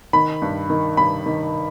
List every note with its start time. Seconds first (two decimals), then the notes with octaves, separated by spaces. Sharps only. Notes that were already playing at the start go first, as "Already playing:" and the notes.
0.13 D#3 B5
0.42 G2
0.70 D#3
0.97 G2 B5
1.26 D#3